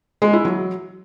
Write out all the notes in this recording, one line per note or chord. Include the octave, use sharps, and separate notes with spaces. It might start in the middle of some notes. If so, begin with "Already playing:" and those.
G#3
E4
F#3